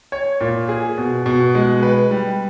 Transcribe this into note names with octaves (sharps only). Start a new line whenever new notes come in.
C#5
A#2
G#4
B2
B2
G#3
B4
G3